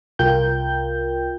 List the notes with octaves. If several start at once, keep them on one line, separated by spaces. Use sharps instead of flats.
C2 F4 A#4 G5 G6